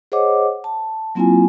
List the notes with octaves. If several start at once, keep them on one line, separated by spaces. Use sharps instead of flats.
G#4 C5 C#5 D#5 F#5 D6
A5
F#3 A#3 C4 E4 F4 G#5